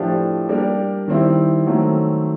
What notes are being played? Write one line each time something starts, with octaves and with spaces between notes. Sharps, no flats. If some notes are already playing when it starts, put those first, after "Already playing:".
Already playing: A2 F3 A3 D4 G4
G3 A#3 D4 G4 A#4
D#3 G3 C4 E4
D#3 F#3 A3 C4